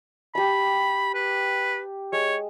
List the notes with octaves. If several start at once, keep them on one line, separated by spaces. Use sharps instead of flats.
G4 A5 B5
B4
G#3 C#5